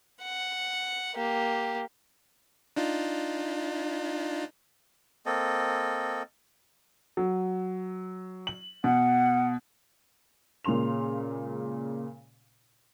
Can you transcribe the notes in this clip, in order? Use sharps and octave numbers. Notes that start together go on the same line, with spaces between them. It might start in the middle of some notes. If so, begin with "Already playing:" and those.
F#5
A#3 G4
D4 D#4 F4
A#3 C4 A4 D#5
F#3
F#7
B2 F#5
A#2 C#3 G#3 C6 F7